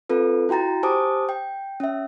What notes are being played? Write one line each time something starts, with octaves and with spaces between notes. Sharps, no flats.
C4 F4 A4 B4
E4 F#4 G5 A#5 A6
G4 C5 G#5 A5 D6 D#6
G5
C#4 E5